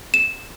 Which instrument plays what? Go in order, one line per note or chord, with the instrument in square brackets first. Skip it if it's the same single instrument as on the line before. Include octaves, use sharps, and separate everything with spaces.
[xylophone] E7